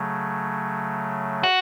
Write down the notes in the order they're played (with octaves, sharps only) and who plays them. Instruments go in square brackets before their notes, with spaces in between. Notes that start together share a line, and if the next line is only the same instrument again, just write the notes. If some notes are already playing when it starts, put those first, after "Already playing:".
Already playing: [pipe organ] C#3 F#3 A3
[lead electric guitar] F#4